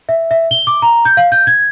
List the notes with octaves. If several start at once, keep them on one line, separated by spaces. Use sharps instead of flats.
E5
E5
G7
D6
A#5
G6
F5
G6
G#6